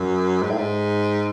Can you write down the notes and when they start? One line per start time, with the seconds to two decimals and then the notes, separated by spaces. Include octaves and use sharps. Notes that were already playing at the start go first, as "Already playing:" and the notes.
Already playing: F#2
0.43 G#2
0.50 A2
0.58 G#2